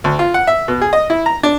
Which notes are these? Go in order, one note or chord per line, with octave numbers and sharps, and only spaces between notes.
D2
F4
F#5
E5
B2
G#4
D#5
E4
A#5
D4